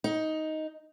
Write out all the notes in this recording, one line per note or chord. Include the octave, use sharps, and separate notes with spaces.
D#4